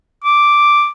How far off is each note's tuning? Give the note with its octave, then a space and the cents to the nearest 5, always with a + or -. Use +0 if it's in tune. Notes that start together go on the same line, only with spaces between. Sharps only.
D6 +0